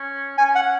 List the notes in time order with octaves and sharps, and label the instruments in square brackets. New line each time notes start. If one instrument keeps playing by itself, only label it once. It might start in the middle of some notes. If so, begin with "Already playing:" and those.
Already playing: [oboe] C#4
[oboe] C#4 [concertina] G#5
[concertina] F#5